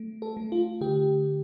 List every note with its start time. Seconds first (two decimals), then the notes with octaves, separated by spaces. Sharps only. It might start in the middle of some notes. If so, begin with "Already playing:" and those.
Already playing: A3
0.22 A4
0.37 A3
0.52 F4
0.81 D3 G4